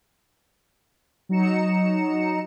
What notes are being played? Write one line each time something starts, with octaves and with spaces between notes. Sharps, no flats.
F#3 D#4 A#5 C#7 E7